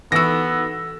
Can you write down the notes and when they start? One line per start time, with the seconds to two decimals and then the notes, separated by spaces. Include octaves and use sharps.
0.12 E3 B3 D#4 F#4 A4 E6 A#6